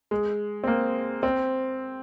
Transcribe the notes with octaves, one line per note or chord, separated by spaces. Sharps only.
G#3
C4
A#3
C4